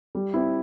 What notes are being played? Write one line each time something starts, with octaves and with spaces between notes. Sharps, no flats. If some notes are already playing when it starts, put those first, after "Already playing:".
G3
C4 E4